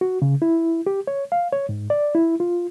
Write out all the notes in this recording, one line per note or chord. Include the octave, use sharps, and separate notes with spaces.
F#4
C#3
E4
G4
C#5
F5
C#5
G#2
D5
E4
F4